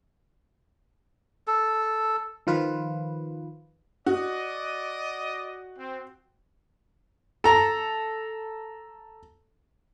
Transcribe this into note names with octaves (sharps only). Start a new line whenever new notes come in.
A4
D#3 F3 F4 B4
F#4 D5 D#5
C4
A4 A#5